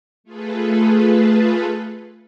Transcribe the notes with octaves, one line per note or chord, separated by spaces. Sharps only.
A3 F4 G#4 A4 B4